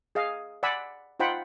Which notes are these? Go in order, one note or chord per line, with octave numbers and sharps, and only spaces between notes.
G#4 D#5 F5
D5 F#5 G#5 B5 E6
D#4 F4 C5 F#5 G5 B5